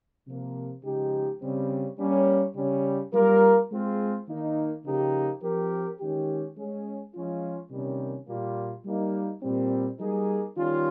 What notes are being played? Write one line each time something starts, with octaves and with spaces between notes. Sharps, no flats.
C3 F3 A#3
C#3 F3 G#3 D#4 G4
C#3 G3 C4
G3 A#3 C#4
C#3 G3 C#4
G3 A#3 F4 A#4
G#3 C4 F4 G#4
D#3 A#3 D#4
C#3 F3 A#3 D#4 G4
F3 C4 G4 A#4
D#3 G#3 C#4 G4
G#3 C#4 G#4
F3 G#3 C#4 F4
C3 D#3 G3 A#3 C#4
A#2 G3 A#3 F4
G3 A#3 D#4
A#2 G3 C4
G3 A#3 D#4 G#4
D#3 G3 C#4 F4